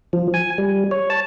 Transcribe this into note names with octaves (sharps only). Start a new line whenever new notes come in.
F3
G#5
G3
C#5
A5